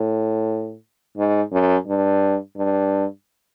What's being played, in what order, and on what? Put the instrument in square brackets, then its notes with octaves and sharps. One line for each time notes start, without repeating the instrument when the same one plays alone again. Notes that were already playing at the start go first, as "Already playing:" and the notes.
Already playing: [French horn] A2
G#2
F#2
G2
G2